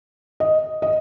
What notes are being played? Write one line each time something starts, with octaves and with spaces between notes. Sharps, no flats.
D#5
D#5